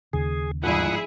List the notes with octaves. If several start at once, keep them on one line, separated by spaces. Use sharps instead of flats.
D#2 C#3 G#4
G1 G#2 F3 E4 G#4 E5 F#5